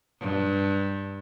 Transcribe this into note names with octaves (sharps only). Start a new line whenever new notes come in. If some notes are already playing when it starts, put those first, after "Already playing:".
G2